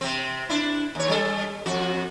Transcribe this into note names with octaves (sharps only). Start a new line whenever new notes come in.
C3 C4
D4 E4
D#2 C#5
G3 A4
F2 F#4